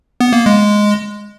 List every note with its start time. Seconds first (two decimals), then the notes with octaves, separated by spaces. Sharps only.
0.21 B3
0.33 A#3
0.46 G#3